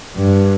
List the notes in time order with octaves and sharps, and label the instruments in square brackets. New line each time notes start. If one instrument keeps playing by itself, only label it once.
[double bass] G2